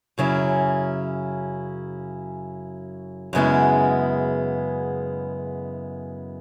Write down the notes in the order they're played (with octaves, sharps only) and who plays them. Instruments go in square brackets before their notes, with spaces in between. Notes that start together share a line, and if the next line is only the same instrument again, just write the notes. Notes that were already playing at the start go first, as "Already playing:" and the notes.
[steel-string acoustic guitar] F#2 C#3 F#3 C#4 E4
F#2 C#3 G#3 B3 E4